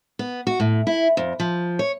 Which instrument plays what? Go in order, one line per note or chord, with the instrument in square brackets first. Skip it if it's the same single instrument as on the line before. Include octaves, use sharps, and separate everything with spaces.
[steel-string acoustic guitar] B3
F#4
A2
E4
F2
F3
C#5